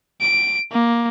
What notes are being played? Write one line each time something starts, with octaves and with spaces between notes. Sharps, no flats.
D7
A#3